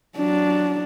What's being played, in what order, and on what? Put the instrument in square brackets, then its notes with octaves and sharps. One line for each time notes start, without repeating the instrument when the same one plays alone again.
[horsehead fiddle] F#3 D4